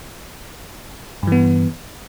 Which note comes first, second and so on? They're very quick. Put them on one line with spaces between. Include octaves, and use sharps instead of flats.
G2 E3 B3